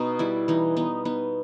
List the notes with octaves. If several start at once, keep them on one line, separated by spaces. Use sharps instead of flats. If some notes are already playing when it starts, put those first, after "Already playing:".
Already playing: B2 B3 D#4
G3 E4
E3 D#4
B3 D#4
B3 D#4